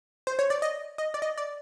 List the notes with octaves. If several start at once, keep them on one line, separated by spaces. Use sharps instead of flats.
C5
C#5
D5
D#5
D#5
D5
D#5
D5